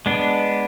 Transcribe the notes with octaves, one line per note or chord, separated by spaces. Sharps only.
G#3 B3 D4